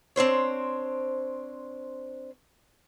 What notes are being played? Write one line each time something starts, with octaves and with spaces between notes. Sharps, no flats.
C4 D4 C5 C#5